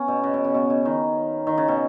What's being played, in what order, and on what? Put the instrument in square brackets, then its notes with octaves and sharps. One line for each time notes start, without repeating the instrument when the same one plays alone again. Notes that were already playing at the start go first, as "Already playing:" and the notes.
Already playing: [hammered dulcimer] B3 C#4
B2
C#3
B2
C#3
B2
C#3
D#3
D#3
C#3
B2